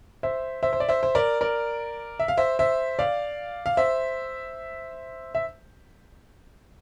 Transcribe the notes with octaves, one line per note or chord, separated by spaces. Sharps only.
C5 E5
C5 E5
C5
D5
C5 E5
C5
A#4 D5
A#4 D5
E5
F5
C5 E5
C5 E5
D5 F5
F5
C5 E5
E5